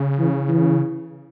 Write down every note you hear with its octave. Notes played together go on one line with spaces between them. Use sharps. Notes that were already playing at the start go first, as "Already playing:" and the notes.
Already playing: C#3
E3
E3